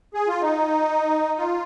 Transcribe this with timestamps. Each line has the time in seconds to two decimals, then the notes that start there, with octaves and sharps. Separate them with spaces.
0.14 G#4
0.28 F4
0.42 D#4
1.39 F4